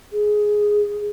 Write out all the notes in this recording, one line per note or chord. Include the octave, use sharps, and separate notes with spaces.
G#4